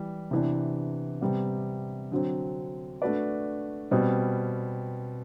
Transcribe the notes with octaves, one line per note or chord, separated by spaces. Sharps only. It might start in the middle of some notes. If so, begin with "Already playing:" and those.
Already playing: E3 G3
C3 E3 B3 D4
C3 G3 B3
D3 F#3 C4
A3 D4 F#4 B4 D5
B2 G3 C4